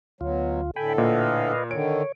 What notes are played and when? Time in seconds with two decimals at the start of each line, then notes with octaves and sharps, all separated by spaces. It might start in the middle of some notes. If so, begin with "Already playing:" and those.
0.21 D2 B2 F#3 F4
0.76 A2 D3 A4 G5 G#5 B5
0.98 A#2 B4 D#5 F5
1.71 D3 D#3 C#5 D7